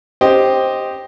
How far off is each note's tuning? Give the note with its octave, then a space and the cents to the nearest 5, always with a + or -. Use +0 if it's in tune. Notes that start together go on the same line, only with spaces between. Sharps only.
G4 +0 C5 +5 D#5 +0